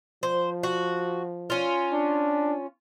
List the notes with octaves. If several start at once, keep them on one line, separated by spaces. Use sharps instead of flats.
F3 C5
F#4
C#4 F4
D4